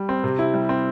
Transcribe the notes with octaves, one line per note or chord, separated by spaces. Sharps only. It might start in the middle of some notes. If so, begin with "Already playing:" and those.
Already playing: G3
C4
C3
E4
G3
C4